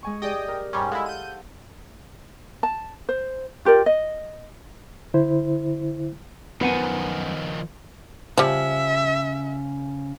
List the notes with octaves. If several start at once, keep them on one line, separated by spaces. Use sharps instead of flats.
G#3 G#5 C#6
G4 G#4 D5 D#5 G5 D#6
A#4
G#2 G3 C#4 C5
G#3 E4 A4 F5 F#5
G6 D#7
A5
C5
F4 G4 A#4 D5
D#5
D3 E4 C5
F#2 D#3 F3 B3 F#5 G#5
C#3 F3 G3 E5